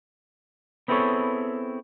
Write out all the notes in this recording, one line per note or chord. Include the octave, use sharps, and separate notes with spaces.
B3 C4 E4 G#4 A4 C#5